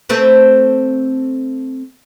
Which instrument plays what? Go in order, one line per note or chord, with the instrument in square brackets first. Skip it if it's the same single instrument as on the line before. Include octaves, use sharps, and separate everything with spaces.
[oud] A3 C4 B4